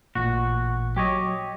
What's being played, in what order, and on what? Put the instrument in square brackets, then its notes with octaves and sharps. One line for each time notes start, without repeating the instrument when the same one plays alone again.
[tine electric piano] A1 A#2 [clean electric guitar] F#4
[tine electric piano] F#3 [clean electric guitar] G4 C#5 D#5